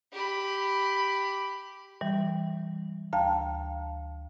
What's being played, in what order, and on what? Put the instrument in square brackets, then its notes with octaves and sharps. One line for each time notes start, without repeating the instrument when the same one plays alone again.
[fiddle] G4 B5
[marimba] E3 G3
D2 F5 G5 A5 A#5